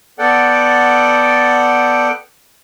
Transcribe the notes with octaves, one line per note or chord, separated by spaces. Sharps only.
B3 A4 D5 F#5 G5